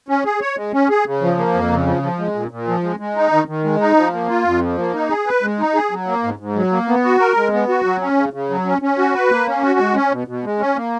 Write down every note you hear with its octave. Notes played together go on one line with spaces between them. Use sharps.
C#4
G#4
C#5
G#3
C#4
G#4
C#3
F3
A#3
F2
C#3
F3
F3
G#3
A#2
A#2
F3
G#3
G#3
D#4
D#3
D#3
G#3
D#4
F3
A#3
F4
F2
F3
A#3
D#4
G#4
B4
G#3
D#4
G#4
F#3
A#3
G#2
G#2
F#3
A#3
B3
F#4
A#4
G#3
B3
F#4
F#3
C#4
C#3
C#3
F#3
C#4
C#4
F#4
B4
A#3
C#4
F#4
G#3
C#4
B2
B2
G#3
C#4
A#3